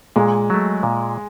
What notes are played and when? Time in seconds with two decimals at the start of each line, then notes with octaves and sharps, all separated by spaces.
0.16 A#2 G#3
0.50 F#3 A3
0.83 A#2